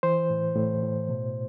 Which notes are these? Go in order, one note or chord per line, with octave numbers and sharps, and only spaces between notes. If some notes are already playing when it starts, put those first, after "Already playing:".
E3 C5
A2
A2
A2
B2